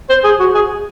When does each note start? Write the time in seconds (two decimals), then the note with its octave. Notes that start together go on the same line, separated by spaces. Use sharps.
0.09 C5
0.24 G#4
0.40 F#4
0.55 G#4